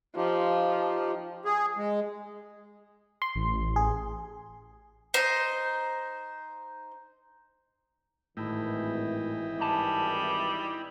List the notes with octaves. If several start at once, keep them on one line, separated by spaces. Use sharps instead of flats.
F3 D#4 F4 G4
G#4
G#3
C6
A1
G#4
D#4 C5
G#1 A2 E3 D#4 E4 G5
G3 G#5 A5